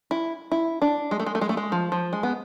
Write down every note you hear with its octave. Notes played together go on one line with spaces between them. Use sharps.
E4
E4
D4
G#3
A3
G#3
A3
G#3
A3
G#3
F3
F3
G#3
B3